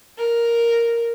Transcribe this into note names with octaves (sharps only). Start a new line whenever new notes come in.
A#4